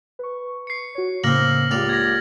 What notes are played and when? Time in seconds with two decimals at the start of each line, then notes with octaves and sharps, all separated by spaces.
0.19 B4 C#6
0.67 C7 C#7
0.95 F#4 C#5
1.24 A2 C#3 A#3 C4 F6 A#6 F#7
1.71 C#2 A#3 G4 D5 A6 F7 F#7
1.89 G#6 A#6